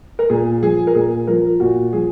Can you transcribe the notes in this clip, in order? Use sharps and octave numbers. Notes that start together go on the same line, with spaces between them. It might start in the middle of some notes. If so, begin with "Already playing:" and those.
A#4
A#2 G#4
F3 G#4
A#4
A#2 G#4
F3 A#4
A#2 F#4
F3 G#4